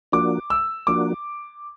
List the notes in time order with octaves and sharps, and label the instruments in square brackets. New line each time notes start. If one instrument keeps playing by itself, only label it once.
[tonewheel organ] F3 A#3 D4 F#4 [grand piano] D6
[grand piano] E6
[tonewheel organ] F3 A#3 D4 F#4 [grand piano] D6